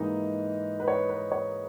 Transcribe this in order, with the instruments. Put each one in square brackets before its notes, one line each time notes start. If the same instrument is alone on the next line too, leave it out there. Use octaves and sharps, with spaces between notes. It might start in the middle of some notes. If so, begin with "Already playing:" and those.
Already playing: [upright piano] G#2 E3 A#3 D#4 D#5
B4
C#5
B4
C#5